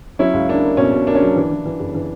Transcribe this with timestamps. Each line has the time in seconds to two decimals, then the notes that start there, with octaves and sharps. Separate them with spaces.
0.19 F#3 C#4 E4
0.34 C#2
0.49 A#3 D4
0.63 A#3
0.77 B2 C#4
0.92 B2
1.07 A#3 D4
1.15 C#4
1.21 F#3 D4
1.36 E3
1.51 E3
1.65 E3
1.79 F#1
1.94 E3